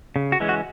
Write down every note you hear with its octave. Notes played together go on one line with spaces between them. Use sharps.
C#3
F#4
E3 G#3 C#4
F#4